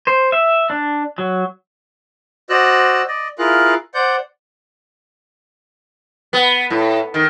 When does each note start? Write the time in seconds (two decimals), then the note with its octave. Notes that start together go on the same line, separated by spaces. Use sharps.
0.07 C5
0.32 E5
0.70 D4
1.18 F#3
2.50 F#4 C5 D5 D#5 E6 F#6
3.08 D5 D#5
3.38 E4 F4 G#4 A#4 F5 F#6
3.94 C5 D5 F#5 G6
6.33 B3
6.70 A2
7.14 D#3